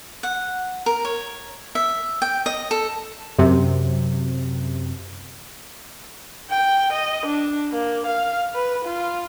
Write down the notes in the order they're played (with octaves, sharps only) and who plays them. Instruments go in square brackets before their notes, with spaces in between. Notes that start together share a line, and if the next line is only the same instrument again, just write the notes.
[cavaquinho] F#5
A#4
C#5
E5
G5
D#5
A4
[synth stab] F#2 C3
[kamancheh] G5
D#5
D4
A#3
F5
B4
F4